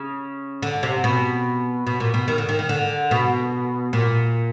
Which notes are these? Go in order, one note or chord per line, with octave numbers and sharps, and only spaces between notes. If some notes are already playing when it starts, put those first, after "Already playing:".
Already playing: C#3
D3
C3
B2
B2
A#2
B2
D#3
D3
D#3
D#3
D3
B2
A#2